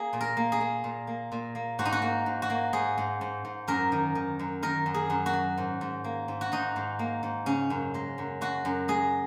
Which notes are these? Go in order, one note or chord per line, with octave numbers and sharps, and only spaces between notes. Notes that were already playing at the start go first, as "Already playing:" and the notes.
Already playing: A#3 G#4
A#2
A#4
A#3
G#4
A#3
A#2
A#3
A#2
A#3
G#2 F#4
D#4
F#4
A#3
G#2
F#4
A#3
G#2 G#4
G#2
G#2
G#2
F#2 A#4
D#3
D#3
F#2
D#3 A#4
F#2
G#4
F#2
F#4
F#3
G#2
G#2
A#3
G#2
F#4
G#2 D#4
G#2
A#3
G#2
C#3 C#4
F#2
G#3
F#2
G#3 F#4
F#2
G#3 G#4